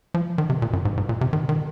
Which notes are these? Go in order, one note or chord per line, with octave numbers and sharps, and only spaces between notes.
F3
D#3
C3
A#2
F#2
G#2
G#2
A#2
C3
D#3
D#3